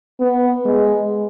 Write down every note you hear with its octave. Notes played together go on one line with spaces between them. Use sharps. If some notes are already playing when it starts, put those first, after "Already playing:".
B3
G#3